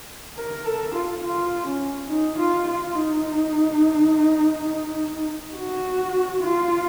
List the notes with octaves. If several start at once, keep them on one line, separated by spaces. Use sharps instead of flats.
A#4
A4
F4
F4
C#4
D#4
F4
F4
D#4
F#4
F4